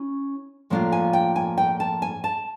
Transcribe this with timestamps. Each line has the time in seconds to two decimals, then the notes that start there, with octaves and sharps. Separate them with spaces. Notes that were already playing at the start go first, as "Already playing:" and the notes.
Already playing: C#4 E4
0.70 A2 F3 A#3 D4 F4
0.92 G#5
1.13 G5
1.36 G#5
1.58 G5
1.80 A5
2.02 G#5
2.24 A5